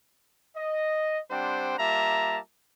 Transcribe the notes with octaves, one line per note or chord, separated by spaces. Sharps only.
D#5
G3 C4 D4 C5 F#5 G5
G3 A#3 F4 E5 A5 A#5